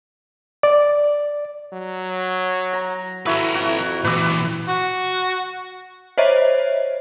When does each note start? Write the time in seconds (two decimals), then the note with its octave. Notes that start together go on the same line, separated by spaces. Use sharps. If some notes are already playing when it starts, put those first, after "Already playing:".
0.63 D5
1.73 F#3
2.73 A#5
3.26 E4 F#4 A4 B4 E6
3.55 F2 F#4
4.04 A#2 E3 B4 D6 E6
4.68 F#4
6.18 C5 C#5 D#5 E5